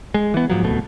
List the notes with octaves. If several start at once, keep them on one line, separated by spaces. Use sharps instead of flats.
G#3
E3 B3
G#2 F3 F#3
D1 C2 B2 A3